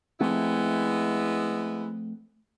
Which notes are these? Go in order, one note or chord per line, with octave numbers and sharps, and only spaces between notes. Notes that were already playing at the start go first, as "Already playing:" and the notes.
F3 G#3 A3 B3 C4 E4